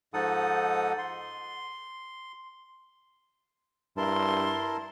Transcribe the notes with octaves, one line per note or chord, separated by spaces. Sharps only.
G#2 F3 D#4 A4 F#5 D#6
C6
G2 E4 A#4 A5 C6